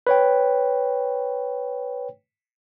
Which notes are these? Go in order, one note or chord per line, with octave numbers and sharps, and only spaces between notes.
B4 C#5 G5